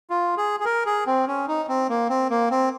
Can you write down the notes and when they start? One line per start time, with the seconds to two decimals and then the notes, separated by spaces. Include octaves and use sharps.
0.10 F4
0.37 G#4
0.60 G#4
0.65 A#4
0.86 G#4
1.07 C4
1.27 C#4
1.48 D#4
1.69 C4
1.89 A#3
2.09 C4
2.30 A#3
2.51 C4